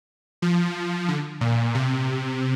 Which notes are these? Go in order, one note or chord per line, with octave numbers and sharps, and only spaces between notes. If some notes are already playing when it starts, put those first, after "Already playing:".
F3
D3
A#2
C3